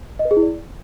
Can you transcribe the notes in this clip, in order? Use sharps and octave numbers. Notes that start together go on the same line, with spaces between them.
D#5
B4
G#4
E4
D5